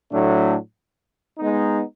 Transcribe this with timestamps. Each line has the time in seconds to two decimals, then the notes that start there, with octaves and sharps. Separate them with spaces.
0.12 A2 F#3 A3 D4
1.38 G#3 B3 D#4